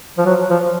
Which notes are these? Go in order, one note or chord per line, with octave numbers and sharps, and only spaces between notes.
F3
F#3
F3